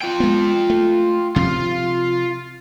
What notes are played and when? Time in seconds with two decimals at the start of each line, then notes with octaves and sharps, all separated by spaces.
0.01 F4 G5
0.20 G#3 B3
0.70 A3
1.36 C3 F3 F4